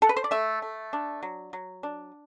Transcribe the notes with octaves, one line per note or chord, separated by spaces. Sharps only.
A4
B4
C5
D5
A3 E5
A3
D4
F#3
F#3
D4